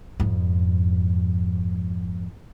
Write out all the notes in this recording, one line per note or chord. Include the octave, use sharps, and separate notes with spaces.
F2 G#2